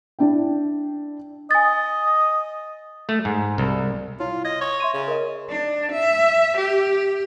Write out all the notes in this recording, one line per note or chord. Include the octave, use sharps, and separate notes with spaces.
D4 E4 G5
D#5 G#5 A6
A3
G#2
C2
E4 F4 C#5
D#5 G#6
C#5
E5 C6 D#7
C#3
A#4 D#5
D4
E5
G4